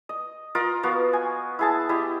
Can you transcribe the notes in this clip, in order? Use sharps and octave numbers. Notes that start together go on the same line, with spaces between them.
D#5
F4 A#4 D#5
F3 B3 F#4 F5
G#5
E4 G#4 A5
E4 G4 D#5